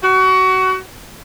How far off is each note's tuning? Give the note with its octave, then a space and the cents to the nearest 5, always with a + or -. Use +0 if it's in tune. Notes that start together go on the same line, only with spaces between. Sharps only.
F#4 +25